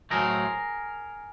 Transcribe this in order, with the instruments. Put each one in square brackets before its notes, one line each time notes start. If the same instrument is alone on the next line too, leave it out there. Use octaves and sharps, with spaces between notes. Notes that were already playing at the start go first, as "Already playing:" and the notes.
[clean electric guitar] A2 F#3 A3 C4 G#4 A#4